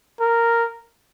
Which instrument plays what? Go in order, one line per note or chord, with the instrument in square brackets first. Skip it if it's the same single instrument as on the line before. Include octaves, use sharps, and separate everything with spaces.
[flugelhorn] A#4